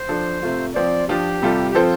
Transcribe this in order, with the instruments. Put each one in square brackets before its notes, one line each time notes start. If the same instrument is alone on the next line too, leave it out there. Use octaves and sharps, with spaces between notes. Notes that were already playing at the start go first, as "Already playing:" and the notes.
Already playing: [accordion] C5
[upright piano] F3 D4 A4
C3 A3 F4
[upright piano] F3 C4 F4 C5 [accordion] D5
[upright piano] F3 D4 F4 [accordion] G4
[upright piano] C3 G3 F4 A4
[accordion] G4
[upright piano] F3 C4 A4 C5 [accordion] F4